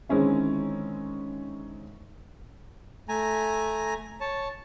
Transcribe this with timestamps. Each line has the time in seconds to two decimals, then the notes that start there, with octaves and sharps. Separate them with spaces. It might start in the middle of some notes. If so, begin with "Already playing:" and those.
0.09 D3 D#3 G#3 C4 C#4 E4
3.09 A3 G#5 A#5
4.21 C#5 A5